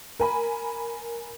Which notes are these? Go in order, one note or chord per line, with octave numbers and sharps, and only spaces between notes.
A#4 G#5 B5